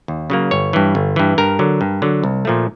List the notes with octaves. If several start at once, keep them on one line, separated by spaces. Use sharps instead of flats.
D#2
C#3 F#3 A#3
G1 C#5
G2 E3
G1
G2 E3
G2 A#4
D3 F#3
G2
D3 F#3
C2
A#2 F3 A3